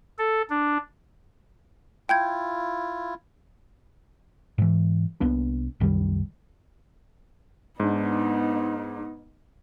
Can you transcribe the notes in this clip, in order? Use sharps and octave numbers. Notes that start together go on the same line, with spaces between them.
A4
D4
E4 F4 G5 G6 G#6
G#2 E3
C2 A#3 B3 D4
C2 F#2 D#3 G3
G#2 B3 D4 D#4